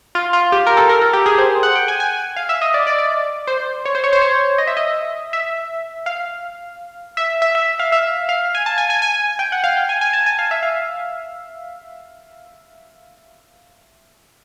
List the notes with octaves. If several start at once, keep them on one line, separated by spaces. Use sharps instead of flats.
F4
F4
G4
A#4
A4
A#4
A4
G4
G#4
C5
F#5
G5
G#5
G#5
F5
E5
D#5
D5
D5
D5
C5
C#5
C5
C#5
C5
C#5
D#5
E5
D#5
E5
F5
E5
E5
E5
F5
E5
F5
G#5
A5
G#5
G#5
G#5
G5
F#5
F5
G5
G#5
G#5
A5
G#5
F5
E5
F5